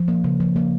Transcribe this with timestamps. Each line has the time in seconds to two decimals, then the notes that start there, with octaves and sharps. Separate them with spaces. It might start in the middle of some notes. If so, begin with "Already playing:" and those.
Already playing: F3
0.08 A#3
0.24 C#3
0.40 F3
0.56 A#3